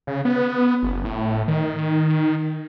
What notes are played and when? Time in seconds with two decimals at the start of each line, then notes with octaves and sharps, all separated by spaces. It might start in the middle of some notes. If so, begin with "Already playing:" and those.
0.07 C#3
0.25 B3
0.83 F#1
1.04 A2
1.48 D#3